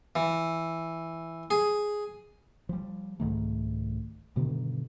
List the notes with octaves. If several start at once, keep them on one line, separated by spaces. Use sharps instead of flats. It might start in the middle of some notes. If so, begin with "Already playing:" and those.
E3
G#4
F3 G3
C2 G#2 D#3 A3
G2 B2 D3 D#3